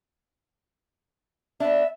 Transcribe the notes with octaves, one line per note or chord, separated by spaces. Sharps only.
B3 D4 E5